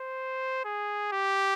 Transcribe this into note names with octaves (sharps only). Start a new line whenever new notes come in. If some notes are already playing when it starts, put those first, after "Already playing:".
Already playing: C5
G#4
G4